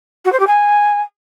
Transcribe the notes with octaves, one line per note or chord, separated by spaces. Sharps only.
F#4
C5
G4
G#5